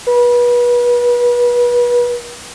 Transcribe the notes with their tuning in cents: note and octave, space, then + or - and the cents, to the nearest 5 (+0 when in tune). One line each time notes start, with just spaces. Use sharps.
B4 -30